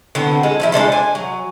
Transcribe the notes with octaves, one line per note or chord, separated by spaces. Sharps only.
D3 F#3 B3 C4
G#3 A4
F3 C4 E4
G#3 D4 A4 C5
G#5
F#3